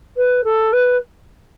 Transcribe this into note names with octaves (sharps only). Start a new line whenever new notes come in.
B4
A4
B4